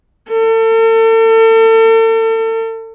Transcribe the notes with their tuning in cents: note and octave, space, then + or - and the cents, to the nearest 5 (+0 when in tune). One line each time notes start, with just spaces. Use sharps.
A4 +40